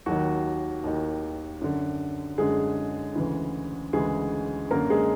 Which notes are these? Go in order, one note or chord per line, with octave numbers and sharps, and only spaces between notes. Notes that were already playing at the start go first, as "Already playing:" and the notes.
D#2 D#3 F#3 F#4
D#2 D#3
F#2 D3
F#2 D3 G#3 G#4
D2 C#3 E3
D2 C#3 E3 G#3 G#4
F#2 D3 A#3 A#4
G#3 G#4